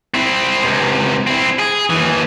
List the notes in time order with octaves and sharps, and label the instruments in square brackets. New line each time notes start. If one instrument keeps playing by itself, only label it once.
[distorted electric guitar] C4 E4
C#2 C3
C4 E4
G#4
D#2 E3